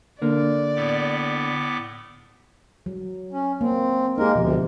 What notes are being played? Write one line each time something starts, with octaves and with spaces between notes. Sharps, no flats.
D3 A#3 D5
A2 B3 D6
F#3
C#4
A#3 C4
G#3 A#3 D#4 G4 A#4
D2 B2 F3